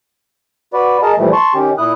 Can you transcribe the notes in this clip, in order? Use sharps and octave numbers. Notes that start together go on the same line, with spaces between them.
F#4 B4 D5
G#4 A#4 D#5 A5
A#2 E3 F3 G3 A3
A5 C6 C#6
D#3 C#4 G4
A#2 E4 D#6 F#6